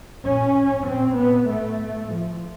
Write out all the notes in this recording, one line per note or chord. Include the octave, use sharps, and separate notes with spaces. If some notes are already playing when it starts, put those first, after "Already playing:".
A#2 C#4
A2
A#2 C4
A#2 B3
A2 A3
A2
A2 F3